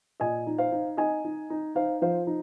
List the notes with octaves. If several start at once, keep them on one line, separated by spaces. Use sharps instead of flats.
A#2 D#5 G#5
D#4
C5 F5
D#4
D#4 D#5 G#5
D#4
D#4
D#4 C5 F5
F3 C5 F5
D#4